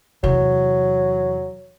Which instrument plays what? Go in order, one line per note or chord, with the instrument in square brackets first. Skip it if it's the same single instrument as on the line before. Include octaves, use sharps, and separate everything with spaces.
[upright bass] E2 C3 [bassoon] F#3